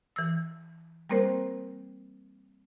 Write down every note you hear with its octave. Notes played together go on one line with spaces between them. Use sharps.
E3 E6
G3 A#3 C4 A#4 C5